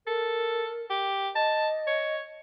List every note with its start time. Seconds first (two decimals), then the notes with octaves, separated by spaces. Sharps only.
0.07 A4 A#4
0.90 G4
1.35 D#5 A5
1.87 C#5